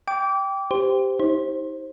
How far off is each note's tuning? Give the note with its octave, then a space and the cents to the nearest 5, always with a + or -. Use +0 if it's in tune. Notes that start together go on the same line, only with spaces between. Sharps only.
G5 +0 D6 -25
G4 +0 C5 -15
D#4 +40 C5 +20